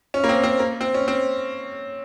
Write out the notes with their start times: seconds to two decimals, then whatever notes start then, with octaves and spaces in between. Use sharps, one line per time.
0.14 C#4
0.24 A#3
0.29 C4
0.43 C4
0.59 A#3
0.81 C4
0.94 C#4
1.08 C4